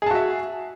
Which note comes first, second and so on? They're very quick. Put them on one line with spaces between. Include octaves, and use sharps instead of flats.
G#4 A5 F#4 E5